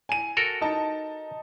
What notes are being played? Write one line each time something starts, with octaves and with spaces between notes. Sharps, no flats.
G#5 D#7
F#4 A4 A#4
D#4 A5